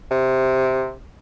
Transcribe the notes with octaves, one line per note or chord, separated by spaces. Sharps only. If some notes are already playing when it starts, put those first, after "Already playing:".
C3